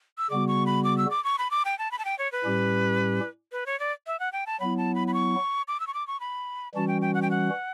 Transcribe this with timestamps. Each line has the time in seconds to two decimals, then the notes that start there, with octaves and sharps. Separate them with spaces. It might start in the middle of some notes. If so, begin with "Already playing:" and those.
0.18 E6
0.30 C#3 G3 B3 F#4 D6
0.48 C#6
0.66 B5
0.84 D6
0.98 E6
1.11 D6
1.24 C#6
1.39 B5
1.51 D6
1.65 G5
1.79 A5
1.92 B5
1.99 A5
2.05 G5
2.19 C#5
2.32 B4
2.45 A2 G3 C#4 G4
3.52 B4
3.66 C#5
3.80 D5
4.07 E5
4.20 F#5
4.32 G5
4.47 A5
4.60 F#3 B3 E4 B5
4.78 A5
4.95 B5
5.08 B5
5.14 C#6
5.68 D6
5.80 E6
5.87 C#6
5.94 D6
6.07 C#6
6.20 B5
6.74 E3 G3 C#4 F#4 A5
6.88 G5
7.02 G5
7.14 F#5
7.22 G5
7.31 F#5